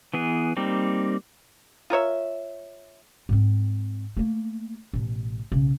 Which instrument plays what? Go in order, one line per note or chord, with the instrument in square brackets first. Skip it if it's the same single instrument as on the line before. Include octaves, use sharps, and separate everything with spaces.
[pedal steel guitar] E3 B3 G#4
G3 A#3 C4 D#4
[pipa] F4 A#4 C#5 E5
[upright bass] G#2 C4
A3 A#3
A1 B2
B1 C#3